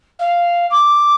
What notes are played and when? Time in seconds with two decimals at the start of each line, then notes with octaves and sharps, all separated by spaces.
0.19 F5
0.70 D6